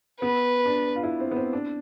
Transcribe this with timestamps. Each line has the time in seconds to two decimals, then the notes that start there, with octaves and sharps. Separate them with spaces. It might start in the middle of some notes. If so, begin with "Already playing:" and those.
0.21 B3 B4
0.66 D4
0.96 F4
1.04 E4
1.20 C4
1.31 B3
1.36 C4
1.53 D4